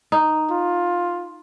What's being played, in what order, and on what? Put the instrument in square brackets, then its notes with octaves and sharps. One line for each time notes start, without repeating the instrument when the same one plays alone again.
[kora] D#4
[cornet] F4